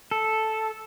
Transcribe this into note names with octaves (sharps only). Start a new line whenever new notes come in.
A4